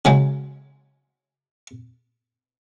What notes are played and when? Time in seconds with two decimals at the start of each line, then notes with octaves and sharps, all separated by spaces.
0.05 C#3 F#3 G#3